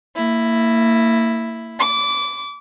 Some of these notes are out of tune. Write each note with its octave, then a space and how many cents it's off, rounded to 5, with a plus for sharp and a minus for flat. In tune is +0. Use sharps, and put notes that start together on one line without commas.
A#3 -30 E4 +0
B5 +40 D6 -20